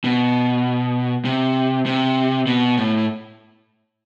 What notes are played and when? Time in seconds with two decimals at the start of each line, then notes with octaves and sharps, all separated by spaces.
0.04 B2
1.25 C3
1.86 C3
2.47 B2
2.77 A2